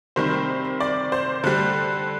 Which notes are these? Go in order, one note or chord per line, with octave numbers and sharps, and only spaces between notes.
C3 D#3 G3 C5
D5
C5
D3 G3